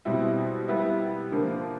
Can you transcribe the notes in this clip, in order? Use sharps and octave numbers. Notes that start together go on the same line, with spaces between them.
B2 G3 C4 E4
G3 B3 E4
D3 F3 A#3